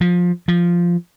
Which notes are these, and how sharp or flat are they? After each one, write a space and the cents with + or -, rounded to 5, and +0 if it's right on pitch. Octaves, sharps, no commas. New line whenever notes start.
F3 +20
F3 -5